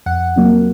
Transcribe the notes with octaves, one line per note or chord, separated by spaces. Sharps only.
F2 F#5
C3 F#3 A#3